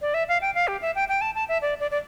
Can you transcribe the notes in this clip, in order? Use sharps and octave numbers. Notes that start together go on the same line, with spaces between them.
D5
E5
F5
G5
F5
G4
E5
G5
G5
A5
A5
E5
D5
D5
D5